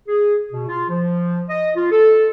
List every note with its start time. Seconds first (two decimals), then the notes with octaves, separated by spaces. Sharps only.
0.08 G#4
0.52 B2
0.67 F4
0.89 F3
1.49 D#5
1.76 F4
1.92 A4